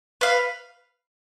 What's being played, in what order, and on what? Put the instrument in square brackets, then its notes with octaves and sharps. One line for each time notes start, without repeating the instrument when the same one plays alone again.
[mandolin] B4 F5